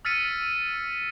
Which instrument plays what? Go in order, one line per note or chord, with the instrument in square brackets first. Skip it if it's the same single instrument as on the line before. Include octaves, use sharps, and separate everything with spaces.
[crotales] E6 F6 A6 B6 C#7 D#7